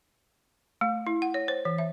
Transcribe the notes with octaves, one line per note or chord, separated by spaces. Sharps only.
A3
E4
F#5
C#5
C5
E3
E5